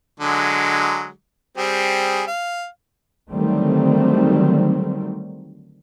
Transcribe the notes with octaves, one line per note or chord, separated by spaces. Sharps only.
D3 F#3 G#3
G3 C4 G#4
F5
D3 D#3 F#3 G3 A3 C4